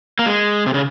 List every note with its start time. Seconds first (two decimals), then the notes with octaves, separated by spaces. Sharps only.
0.19 A#3
0.26 G#3
0.66 C3
0.74 C#3